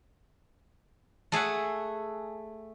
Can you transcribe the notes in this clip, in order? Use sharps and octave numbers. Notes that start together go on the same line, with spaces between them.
A3 G#4 E5 F#5